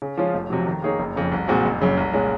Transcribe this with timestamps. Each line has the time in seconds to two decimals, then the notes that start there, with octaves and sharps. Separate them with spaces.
0.02 C#3
0.17 F3 G#3 C#4 F4
0.34 F1
0.50 F2 C3 F#3
0.66 D#3
0.82 A#3 D#4 G#4 C#5
0.99 F#1
1.16 F2 C#3
1.32 C2
1.48 A#2 G#3 C4 F#4
1.64 F#1
1.81 F#2 C#3
1.97 C2
2.13 A#2 G#3 C#4